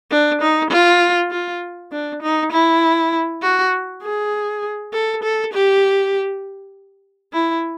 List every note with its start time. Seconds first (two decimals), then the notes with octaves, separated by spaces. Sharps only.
0.11 D4
0.41 D#4
0.71 F4
1.31 F4
1.91 D4
2.22 D#4
2.52 E4
3.42 F#4
4.03 G#4
4.93 A4
5.23 A4
5.53 G4
7.33 E4